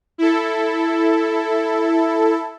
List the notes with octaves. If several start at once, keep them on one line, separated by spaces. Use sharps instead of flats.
E4 A4